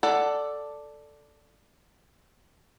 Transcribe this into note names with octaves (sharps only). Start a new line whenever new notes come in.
A4 D5 F#5